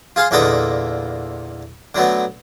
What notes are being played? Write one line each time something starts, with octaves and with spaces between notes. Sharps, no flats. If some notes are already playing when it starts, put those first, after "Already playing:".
F4 G#4 F5 C6
E2 A#2 D3 A4 B4 D#5
D3 F#3 A3 B3